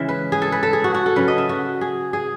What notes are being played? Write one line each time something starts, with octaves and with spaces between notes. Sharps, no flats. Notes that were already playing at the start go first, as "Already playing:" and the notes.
Already playing: C#3 E3 G#3 E5
B4
G#4
A4
B4
A4
G#4
F#4
F#4
A4
C#3 F#3 C#4 B4
D#5
E5
F#4
G#4
G#4